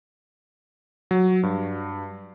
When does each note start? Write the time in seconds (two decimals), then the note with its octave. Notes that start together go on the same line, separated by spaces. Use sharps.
1.11 F#3
1.43 G2